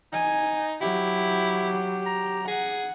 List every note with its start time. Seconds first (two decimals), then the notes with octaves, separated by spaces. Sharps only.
0.13 D#4 G#5
0.81 F#3 E4 G4
2.06 A#5
2.48 G#4 F#5